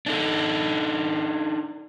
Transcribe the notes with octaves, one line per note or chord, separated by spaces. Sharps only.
D4 D#4 A4